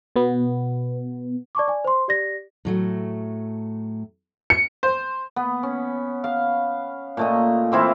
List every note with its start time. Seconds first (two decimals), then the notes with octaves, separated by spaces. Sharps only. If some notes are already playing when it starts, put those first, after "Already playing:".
0.16 B2 B3
1.55 D5 A5 C#6 D6
1.68 D5 G#5
1.84 C5 C6
2.08 G4 D5 A#6
2.65 A2 F#3 A3
4.50 C#7
4.83 C5
5.36 B3
5.63 C#4
6.24 F5
7.17 A#2 A3 D#5
7.72 E3 C4 E4 F4